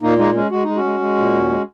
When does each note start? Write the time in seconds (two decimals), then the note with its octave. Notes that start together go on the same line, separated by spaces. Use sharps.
0.02 A#2 A#3 D#4
0.18 G#3 A#3 D#4
0.34 G#3 C#4
0.51 G#3 F#4
0.64 G#3 D#4
0.76 C#4 F#4
0.84 G#3
1.00 G#3
1.17 A#2
1.33 D#2
1.49 G#3